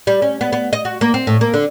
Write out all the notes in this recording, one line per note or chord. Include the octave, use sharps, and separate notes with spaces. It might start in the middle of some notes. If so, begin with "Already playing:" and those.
G3
C#4
B3
B3
D#5
F#4
A#3
C4
A2
A#3
D3